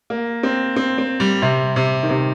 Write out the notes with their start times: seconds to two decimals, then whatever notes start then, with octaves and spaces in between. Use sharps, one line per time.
0.10 A#3
0.43 C4
0.76 C4
0.98 C4
1.20 G3
1.42 C3
1.76 C3
2.03 D#3
2.10 C3